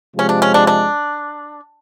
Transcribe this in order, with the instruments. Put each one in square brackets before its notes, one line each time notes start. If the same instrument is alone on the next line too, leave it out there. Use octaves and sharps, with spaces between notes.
[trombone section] C3 F3 G#3 [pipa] C#4
[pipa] D4
C#4
D4
D4